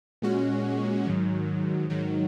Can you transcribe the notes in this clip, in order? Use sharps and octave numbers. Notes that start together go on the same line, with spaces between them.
A#2 G#3 C#4 F#4
G#2 D#3 F#3
G#2 D#3 F#3